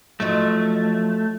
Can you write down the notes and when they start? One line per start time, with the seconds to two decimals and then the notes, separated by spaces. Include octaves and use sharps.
0.20 F3 F#3 A3 D#4